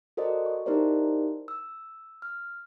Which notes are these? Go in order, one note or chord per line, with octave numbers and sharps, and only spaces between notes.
F#4 A4 A#4 C5 D5 D#5
C#6
D#4 E4 G4 A#4 C5 D5
E6
F6